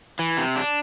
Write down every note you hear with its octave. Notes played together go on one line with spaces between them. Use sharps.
E3
C3
D4